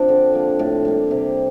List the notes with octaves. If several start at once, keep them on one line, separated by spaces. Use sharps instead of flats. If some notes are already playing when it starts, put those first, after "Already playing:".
Already playing: F3 C4 D4
D3
F3 A#3
A2
G3 A#3
C3